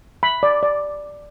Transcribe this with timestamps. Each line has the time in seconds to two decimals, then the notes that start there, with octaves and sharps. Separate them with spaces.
0.23 B5
0.43 D5
0.63 D5